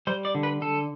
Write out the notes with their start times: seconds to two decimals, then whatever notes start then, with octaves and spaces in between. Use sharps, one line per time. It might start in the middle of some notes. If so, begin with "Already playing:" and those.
0.07 G3 C5
0.25 D5
0.35 D3
0.43 B4
0.61 D3 A4